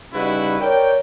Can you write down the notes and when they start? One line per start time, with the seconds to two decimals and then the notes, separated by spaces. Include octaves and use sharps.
0.13 C#3 G3 D#4 E4 F#4 B4
0.61 A#4 C#5 D5 G5